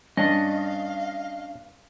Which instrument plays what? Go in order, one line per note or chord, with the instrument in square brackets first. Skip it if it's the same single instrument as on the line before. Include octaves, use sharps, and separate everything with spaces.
[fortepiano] G2 [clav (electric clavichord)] C#4 D4 [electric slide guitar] D#5 [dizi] F5